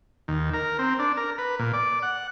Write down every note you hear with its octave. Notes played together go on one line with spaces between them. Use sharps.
D#2
A#4
C4
D4
A#4
B4
A#2
D5
F#5